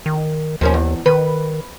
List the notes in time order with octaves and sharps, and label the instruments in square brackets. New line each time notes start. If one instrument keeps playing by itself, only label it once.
[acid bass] D#3
[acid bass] D#2 [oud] F3 A#3 C#4
[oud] E2
[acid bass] D#3 [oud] B4